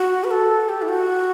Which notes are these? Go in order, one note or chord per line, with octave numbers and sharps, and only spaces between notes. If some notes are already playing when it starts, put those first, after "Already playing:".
Already playing: F#4
B4
A4
G4
E4
F#4